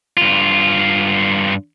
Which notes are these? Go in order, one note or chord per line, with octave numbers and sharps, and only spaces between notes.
G2 F4